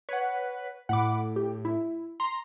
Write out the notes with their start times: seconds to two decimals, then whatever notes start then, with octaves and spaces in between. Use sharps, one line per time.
0.09 B4 C#5 F#5
0.89 A2 F#5 B5 D6
1.36 G4
1.65 E4
2.20 A#5 C6